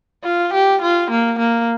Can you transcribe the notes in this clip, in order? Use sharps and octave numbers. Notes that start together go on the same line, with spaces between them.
F4
G4
F4
A#3
A#3